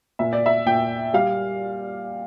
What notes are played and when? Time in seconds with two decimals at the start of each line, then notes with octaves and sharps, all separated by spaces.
0.19 A#2 E5
0.33 D5
0.46 E5
0.66 A#2 G5
1.13 G3 F5